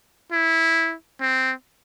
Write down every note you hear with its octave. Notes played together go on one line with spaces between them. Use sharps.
E4
C4